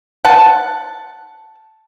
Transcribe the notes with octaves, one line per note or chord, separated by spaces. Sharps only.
F#5 A5